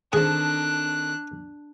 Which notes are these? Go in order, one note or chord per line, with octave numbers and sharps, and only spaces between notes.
D#3 C4 D4 G#4 A4 F#6